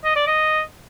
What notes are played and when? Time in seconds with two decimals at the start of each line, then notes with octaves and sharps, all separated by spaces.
0.05 D#5
0.16 D5
0.27 D#5